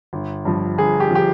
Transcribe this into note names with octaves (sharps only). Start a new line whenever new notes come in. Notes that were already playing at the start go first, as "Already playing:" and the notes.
G1
G2 F3
G1 G#4
G4
F3 G4